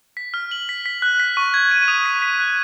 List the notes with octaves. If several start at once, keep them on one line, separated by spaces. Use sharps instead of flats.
B6
F6
F#7
B6
B6
F#6
B6
C#6
G#6
D#7
D#6
B6
B6
F#6